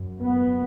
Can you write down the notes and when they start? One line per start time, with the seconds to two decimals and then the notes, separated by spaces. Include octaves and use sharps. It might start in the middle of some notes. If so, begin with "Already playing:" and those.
Already playing: F#2
0.19 B3